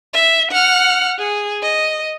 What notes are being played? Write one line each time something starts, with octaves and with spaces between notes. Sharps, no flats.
E5
F#5 F6
G#4
D#5